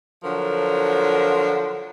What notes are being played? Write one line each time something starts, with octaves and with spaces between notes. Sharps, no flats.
D3 F3 F#3 A#4